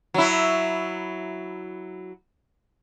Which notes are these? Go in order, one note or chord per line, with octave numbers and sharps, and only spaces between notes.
F#3 E4